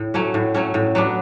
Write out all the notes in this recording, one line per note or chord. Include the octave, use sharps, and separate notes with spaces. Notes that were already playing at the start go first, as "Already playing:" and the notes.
Already playing: A2
F#3 A3 C#4
A2
F#3 A3 C#4
A2
F#3 B3 D4